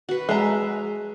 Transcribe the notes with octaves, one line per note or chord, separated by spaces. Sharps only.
F#4 B4
G#3 E5 A#5